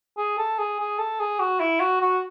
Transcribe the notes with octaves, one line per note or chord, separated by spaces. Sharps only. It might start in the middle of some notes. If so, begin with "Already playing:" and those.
G#4
A4
G#4
G#4
A4
G#4
F#4
E4
F#4
F#4